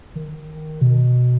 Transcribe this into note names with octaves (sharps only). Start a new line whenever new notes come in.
D#3
B2